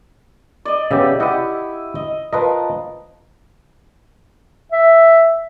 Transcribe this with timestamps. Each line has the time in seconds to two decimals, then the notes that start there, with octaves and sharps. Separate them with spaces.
0.65 D5 D#5
0.91 C#3 B3 G4 E5
1.20 E4 G4 D#5 F#5 D#6
1.95 D#5
2.33 F3 A#4 B4 D#5
4.72 E5